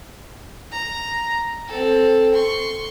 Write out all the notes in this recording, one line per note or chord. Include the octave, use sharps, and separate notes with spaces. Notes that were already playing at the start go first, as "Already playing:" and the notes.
A#5
C4 A4
C6 C#6